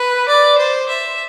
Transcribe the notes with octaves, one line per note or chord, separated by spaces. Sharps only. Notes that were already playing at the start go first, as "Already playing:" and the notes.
Already playing: B4
D5
C5
E5